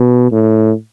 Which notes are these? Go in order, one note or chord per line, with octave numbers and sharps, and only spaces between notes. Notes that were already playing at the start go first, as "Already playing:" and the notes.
Already playing: B2
A2